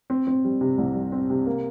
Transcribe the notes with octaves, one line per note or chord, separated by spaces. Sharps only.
C4
C4
G3
C3
C2
G3
C4
C3
A#3